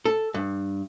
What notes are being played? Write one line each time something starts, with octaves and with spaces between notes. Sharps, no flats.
A4
G2